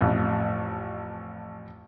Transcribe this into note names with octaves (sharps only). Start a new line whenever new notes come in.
A1 F2